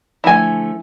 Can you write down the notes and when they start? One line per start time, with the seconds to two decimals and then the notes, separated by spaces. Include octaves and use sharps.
0.24 D3 F3 A3 E4 G#5